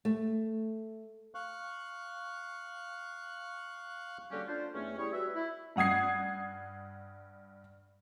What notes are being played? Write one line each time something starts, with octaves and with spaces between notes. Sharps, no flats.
A3
F5 C#6 F#6
D3 G3 A#3 C#4 F#4 G4
D4 F4 C5
E2 A3 C4 C#4
G3 E4 G#4 C#5
G3 F#4 B4 E5
E4
G2 F#5 D#6 G#6 C7